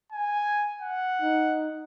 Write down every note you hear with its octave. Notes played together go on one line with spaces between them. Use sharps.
G#5
F#5
D#4